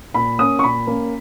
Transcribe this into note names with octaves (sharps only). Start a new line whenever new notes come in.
A#2 B5
A#3 C#4 D#6
C#6
A#2 B5
A#3 C#4